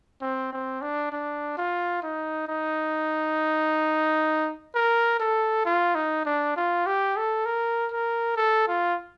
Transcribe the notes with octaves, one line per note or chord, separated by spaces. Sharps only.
C4
C4
D4
D4
F4
D#4
D#4
A#4
A4
F4
D#4
D4
F4
G4
A4
A#4
A#4
A4
F4